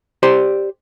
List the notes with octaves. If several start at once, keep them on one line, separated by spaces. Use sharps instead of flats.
G4 C5 D5 C6